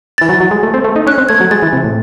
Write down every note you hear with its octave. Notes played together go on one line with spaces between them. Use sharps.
E3 A6
F#3
F#3
G#3
A3
C4
A3
D#4
C#4 F#6
C4
A3 G#6
F#3
G#3 A6
E3
C3
A2